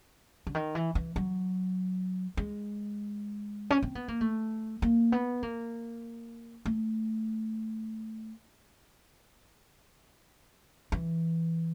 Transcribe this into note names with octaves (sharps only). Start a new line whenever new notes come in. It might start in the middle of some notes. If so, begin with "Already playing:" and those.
D3
D#3
E3
E3
F#3
G#3
C#4
C4
B3
A#3
A3
A#3
B3
A#3
A3
E3